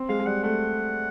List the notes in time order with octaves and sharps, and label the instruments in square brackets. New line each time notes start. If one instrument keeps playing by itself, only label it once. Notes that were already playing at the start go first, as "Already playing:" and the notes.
Already playing: [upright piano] C4
[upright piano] G#3 [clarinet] F5
[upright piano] G#3
[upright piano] G3 [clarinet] F#5
[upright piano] A3 [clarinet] F#5